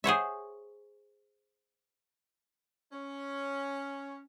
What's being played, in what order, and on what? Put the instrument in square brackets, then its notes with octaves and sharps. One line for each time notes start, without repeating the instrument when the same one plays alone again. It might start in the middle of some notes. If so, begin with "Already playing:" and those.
[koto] G#4 C5 C#5 E5
[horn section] C#4